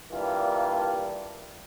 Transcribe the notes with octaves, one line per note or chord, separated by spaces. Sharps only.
E3 G3 A#3 D4 F4